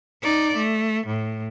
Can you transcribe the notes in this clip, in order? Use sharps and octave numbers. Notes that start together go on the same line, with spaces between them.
D#4 D5
A3
A2